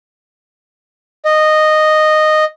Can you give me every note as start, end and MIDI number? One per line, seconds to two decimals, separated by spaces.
1.25 2.44 75